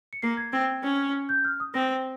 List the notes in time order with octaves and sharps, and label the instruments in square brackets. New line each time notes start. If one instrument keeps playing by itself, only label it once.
[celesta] C#7
[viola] A#3 [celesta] C7
[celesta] G#6
[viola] C4 [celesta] G#6
[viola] C#4
[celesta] G6
F6
D#6
[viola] C4 [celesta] A#6